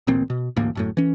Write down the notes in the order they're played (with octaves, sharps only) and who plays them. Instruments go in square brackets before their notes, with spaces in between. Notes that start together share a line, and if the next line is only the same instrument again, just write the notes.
[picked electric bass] D1 A1 A#2 C4
B2
A1 D2 G#2 A#3
G1 F#2 A2
E3 C#4